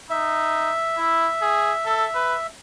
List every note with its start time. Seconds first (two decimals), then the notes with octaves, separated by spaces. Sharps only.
0.10 D#4 E5
0.98 E4
1.42 G#4
1.86 A4
2.15 B4